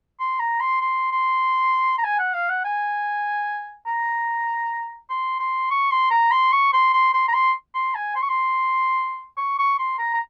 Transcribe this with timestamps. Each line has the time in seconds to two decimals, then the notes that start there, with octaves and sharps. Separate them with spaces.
0.20 C6
0.40 A#5
0.61 C6
0.81 C6
1.12 C6
1.99 A#5
2.04 G#5
2.19 F#5
2.34 F5
2.50 F#5
2.64 G#5
3.87 A#5
5.10 C6
5.40 C6
5.71 C#6
5.91 C6
6.11 A#5
6.32 C6
6.53 C#6
6.73 C6
6.93 C6
7.13 C6
7.28 A#5
7.34 C6
7.74 C6
7.95 G#5
8.16 C6
8.23 C#6
8.29 C6
9.37 C#6
9.59 C#6
9.79 C6
9.99 A#5
10.14 A#5